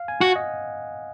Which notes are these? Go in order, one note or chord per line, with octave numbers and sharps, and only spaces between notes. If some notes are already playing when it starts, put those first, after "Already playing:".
Already playing: F5
G#5
F#4 F#5
D#5